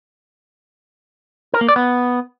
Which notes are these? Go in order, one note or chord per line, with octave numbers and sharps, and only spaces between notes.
A#4
A#3
D5
B3